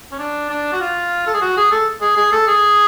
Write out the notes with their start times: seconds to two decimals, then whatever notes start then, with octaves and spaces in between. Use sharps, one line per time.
0.12 C#4
0.19 D4
0.50 D4
0.73 F#4
0.81 F4
1.27 A4
1.34 G#4
1.42 F#4
1.57 G#4
1.72 A4
2.01 G#4
2.17 G#4
2.33 A4
2.48 G#4